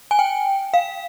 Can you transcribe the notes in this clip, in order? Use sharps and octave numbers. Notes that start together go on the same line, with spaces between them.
G#5
G5
F5